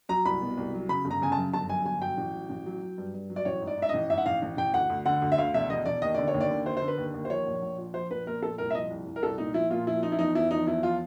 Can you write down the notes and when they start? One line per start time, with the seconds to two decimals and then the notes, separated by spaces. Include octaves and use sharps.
0.09 F#3 A#5
0.25 C2 B5
0.42 B2
0.57 C2
0.73 F#3
0.89 C#3 B5
1.05 G1
1.11 A#5
1.22 C#3 G#5
1.32 A5
1.37 F#2
1.53 G1 A5
1.69 F#2 G#5
1.85 G1 G#5
2.02 F#3 G5
2.18 A1
2.33 F#3
2.50 A1
2.66 F#3
2.82 F#3
2.98 G2
3.14 G2
3.30 F#3
3.36 D5
3.45 A1 C#5
3.62 G#2
3.68 D5
3.77 G#2 E5
3.89 A1 D#5
4.10 G#2 E5
4.18 F#5
4.26 A1 F5
4.42 A1
4.57 A1 G5
4.74 D2 F#5
4.90 D2
5.06 D3 F#5
5.22 D2
5.32 E5
5.38 D2 F5
5.54 E1 E5
5.69 E1 D#5
5.86 E1 D5
6.02 D#2 D#5
6.15 D3 D5
6.28 C#5
6.34 D#2
6.41 D5
6.51 D3
6.66 D3 C5
6.77 C5
6.82 D3
6.88 B4
6.98 D#2
7.14 D#2
7.25 C5
7.30 F3 C#5
7.47 A#1
7.62 A#1
7.78 F3
7.94 F3 C5
8.11 A#1 B4
8.26 A#2 A#4
8.42 A#2 A4
8.58 C2 A#4
8.70 E5
8.75 F3 D#5
8.91 C2
9.06 C2
9.16 A#4
9.23 C2 A4
9.38 A#2 D#4
9.54 F3 E4
9.70 A#2 F4
9.87 F3 E4
10.02 F3 D#4
10.12 E4
10.19 E2 D#4
10.35 E2 E4
10.51 F3 D#4
10.67 E2 E4
10.83 F3 F4